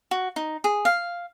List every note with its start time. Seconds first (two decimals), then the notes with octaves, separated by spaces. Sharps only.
0.11 F#4
0.36 D#4
0.64 G#4
0.85 F5